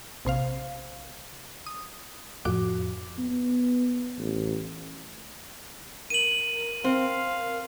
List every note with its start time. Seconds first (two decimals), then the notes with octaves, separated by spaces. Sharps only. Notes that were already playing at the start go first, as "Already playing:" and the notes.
0.25 A#1 C3 C5 F5
1.66 D#6
2.45 F2 A2 F3 F#4 D6
3.19 B3
4.18 A1
6.10 A#4 D#7 F#7
6.84 C4 F5